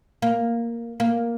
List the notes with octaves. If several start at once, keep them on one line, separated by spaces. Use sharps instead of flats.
A#3
A#3